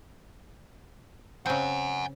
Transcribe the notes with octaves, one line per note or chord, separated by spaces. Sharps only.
C#3 C4 F#5 G#5